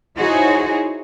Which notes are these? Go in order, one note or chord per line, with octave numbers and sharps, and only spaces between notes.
D#4 E4 F#4 G#4 C5 C#5